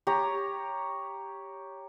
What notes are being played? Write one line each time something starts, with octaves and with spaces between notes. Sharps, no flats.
G4 C#5 A#5